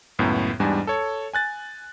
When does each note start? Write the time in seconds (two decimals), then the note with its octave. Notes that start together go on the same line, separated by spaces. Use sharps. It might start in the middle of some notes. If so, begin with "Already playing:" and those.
0.19 C#2 F#2 A2 B3
0.60 E2 G#2 G3 D4 G#5
0.87 A4 C#5
1.34 G#5 F#6 A6